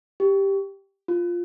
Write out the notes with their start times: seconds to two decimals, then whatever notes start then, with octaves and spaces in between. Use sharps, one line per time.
0.20 G4
1.08 F4